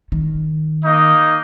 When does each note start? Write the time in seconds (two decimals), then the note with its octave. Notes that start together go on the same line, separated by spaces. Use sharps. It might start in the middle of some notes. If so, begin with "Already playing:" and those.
0.12 D#3
0.84 A#3 D#4 D#5